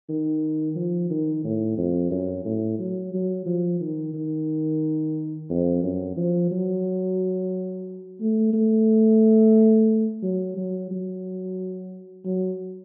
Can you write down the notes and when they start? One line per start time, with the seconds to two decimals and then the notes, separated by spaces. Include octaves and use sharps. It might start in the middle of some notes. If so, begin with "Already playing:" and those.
0.09 D#3
0.75 F3
1.10 D#3
1.44 A2
1.77 F2
2.11 F#2
2.45 A2
2.79 F#3
3.13 F#3
3.46 F3
3.80 D#3
4.14 D#3
5.50 F2
5.83 F#2
6.17 F3
6.51 F#3
8.21 A3
8.53 A3
10.22 F#3
10.56 F#3
10.91 F#3
12.25 F#3